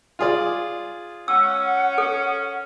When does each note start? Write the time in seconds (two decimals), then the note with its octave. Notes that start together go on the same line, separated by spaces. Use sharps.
0.19 F4 G#4 D5
1.28 C#4 F#5 E6
1.98 A4